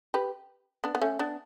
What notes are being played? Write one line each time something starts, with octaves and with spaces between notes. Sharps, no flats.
G4 B4
B3 D4
B3
A3 C#4
B3 D4